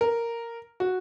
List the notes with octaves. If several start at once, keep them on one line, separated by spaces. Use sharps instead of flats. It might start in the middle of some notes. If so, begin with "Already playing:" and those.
A#4
F#4